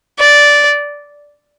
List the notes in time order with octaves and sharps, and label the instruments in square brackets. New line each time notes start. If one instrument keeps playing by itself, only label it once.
[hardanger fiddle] D5